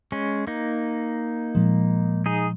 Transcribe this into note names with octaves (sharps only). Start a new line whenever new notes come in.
G#3 C#4
A#3 D#4
A#2 F3 G#3
D#4 G#4